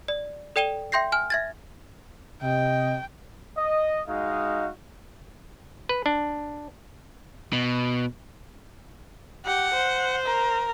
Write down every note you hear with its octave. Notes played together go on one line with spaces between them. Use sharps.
D5
A4 D5 G5 D#7 E7 G7
E5 G5 C6 G6 A#6 C7
G#5 F6
E5 G#6 A6
C3 D#5 G5
D#5
G#3 D#4 F#4 F5
B4
D4
B2
G4 F#5
C5
A#4